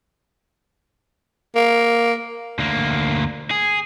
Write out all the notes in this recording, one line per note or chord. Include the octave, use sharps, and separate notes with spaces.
A#3
D2 A#3
G#4